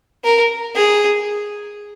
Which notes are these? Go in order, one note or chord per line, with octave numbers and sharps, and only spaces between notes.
A#4
G#4